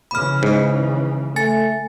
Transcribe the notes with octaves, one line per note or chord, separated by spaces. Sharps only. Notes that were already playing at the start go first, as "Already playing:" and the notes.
C#3 E3 B5 F6
G#2
A3 G#5 A6 C#7